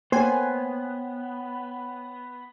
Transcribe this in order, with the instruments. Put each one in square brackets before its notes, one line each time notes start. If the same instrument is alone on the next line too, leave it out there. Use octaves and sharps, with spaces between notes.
[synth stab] A#3 G#5 [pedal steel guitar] B3 [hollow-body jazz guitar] C5 [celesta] C#5 G5